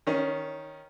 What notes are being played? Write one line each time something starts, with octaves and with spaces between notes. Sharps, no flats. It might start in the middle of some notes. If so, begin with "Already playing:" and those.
D#3 C#4